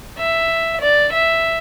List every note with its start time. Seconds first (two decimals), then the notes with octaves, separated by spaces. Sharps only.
0.18 E5
0.81 D5
1.13 E5